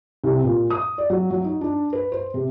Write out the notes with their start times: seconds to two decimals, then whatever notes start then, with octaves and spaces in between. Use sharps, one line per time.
0.24 C2
0.43 A#2
0.70 D#6
0.98 D5
1.10 F#3
1.30 F#3
1.44 D#4
1.61 D4
1.93 B4
2.12 C5
2.34 C3